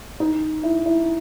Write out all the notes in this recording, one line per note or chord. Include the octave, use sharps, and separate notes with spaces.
D#4
E4
E4